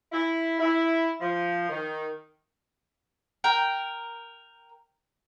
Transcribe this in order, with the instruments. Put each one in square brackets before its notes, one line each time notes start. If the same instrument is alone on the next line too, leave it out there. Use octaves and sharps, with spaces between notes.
[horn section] E4
E4
F3
D#3
[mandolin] A#4 G5